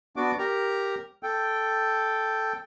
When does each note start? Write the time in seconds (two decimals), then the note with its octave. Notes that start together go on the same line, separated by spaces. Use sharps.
0.16 B3 D4 F#4 D6
0.39 G4 A#4 A#5
1.23 A4 G5